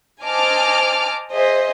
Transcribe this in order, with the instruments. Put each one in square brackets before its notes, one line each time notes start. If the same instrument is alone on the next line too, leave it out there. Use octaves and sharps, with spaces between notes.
[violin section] C5 D#5 G#5 A5 D6 F6
G#4 C5 D#5 E5